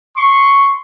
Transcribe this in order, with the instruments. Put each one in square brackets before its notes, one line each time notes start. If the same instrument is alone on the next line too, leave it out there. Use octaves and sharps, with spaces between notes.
[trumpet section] C6 C#6